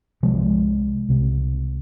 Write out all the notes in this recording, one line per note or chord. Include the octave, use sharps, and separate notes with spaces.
C2 C3 F3 G#3
C2 C3